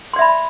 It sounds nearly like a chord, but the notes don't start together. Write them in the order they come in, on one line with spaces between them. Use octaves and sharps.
C6 D5 E5 B5